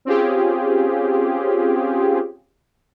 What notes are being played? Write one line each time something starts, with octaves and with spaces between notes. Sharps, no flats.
C4 C#4 F4 G4 G#4